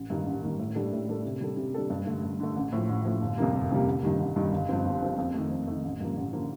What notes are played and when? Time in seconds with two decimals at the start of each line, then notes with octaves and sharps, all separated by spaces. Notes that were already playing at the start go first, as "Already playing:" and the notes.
Already playing: A1
0.10 G2 D#3 A#3
0.26 A1
0.43 G2 D#3 A#3
0.59 A2
0.75 G3 D4 A4
0.92 A2
1.08 G3 D4 A4
1.25 C3
1.41 G3 D4 A4
1.57 C3
1.74 G3 D4 A4
1.90 G2
2.06 D3 A3
2.23 G2
2.40 D3 A3
2.56 A1
2.72 A2 F3
2.89 A1
3.05 A2 F3
3.22 G1
3.38 F2 C3 G3 A#3
3.54 G1
3.71 F2 C3 G3 A#3
3.87 A1
4.03 G2 D#3 G3
4.19 A1
4.36 G2 D#3 G3
4.52 G1
4.69 G2 F3 C4
4.85 G1
5.02 G2 F3 C4
5.18 F2
5.34 D#3 A3
5.50 F2
5.67 D#3 A3
5.84 A1
6.00 G2 D3 F3 A#3
6.17 A1
6.32 D3 F3 A#3